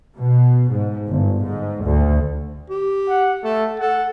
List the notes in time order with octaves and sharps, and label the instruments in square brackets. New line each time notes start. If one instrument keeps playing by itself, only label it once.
[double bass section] B2
G#2
G1
G#2
D2
[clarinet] G4
[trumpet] F#5
[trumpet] A3 [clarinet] A4
[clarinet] A4 [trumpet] F#5